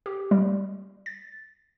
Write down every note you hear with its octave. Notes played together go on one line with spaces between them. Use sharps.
G4
G3
A6